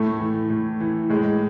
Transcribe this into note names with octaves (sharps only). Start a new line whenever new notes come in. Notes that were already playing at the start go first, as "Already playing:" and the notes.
Already playing: A2 A3
E3
A2
E3
A2 G#3